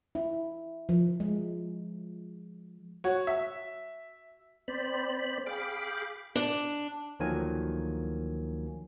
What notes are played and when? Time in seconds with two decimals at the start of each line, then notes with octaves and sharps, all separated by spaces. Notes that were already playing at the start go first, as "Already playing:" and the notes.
0.15 E4
0.89 F3
1.20 G#3
3.04 F#4 C#5 F#5
3.27 E5
4.68 C4 C5 D5 B5
5.46 G#4 F5 G5 B5 D6
6.35 D4
7.20 D2 D#3 F3 F#3 A#3 G#5